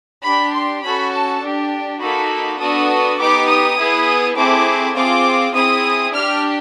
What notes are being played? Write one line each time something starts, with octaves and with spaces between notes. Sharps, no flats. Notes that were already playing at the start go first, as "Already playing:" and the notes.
D4 G4 B5
C6
C#4 F#4 A4 B5
A5
D4 G4
A#3 D#4 F#4 A4 B5
B3 D4 F#4 A4 D#6
B3 D#4 G4 D6
D#6
B3 E4 G#4
A3 C4 E4 G#4 D6
C4 F4 G#4 D6
C4 E4 G#4 D#6
D4 G4 F6